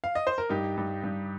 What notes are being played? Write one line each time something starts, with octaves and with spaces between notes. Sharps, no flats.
F5
D#5
C5
A#4
G2 D#4 G4
G2
G2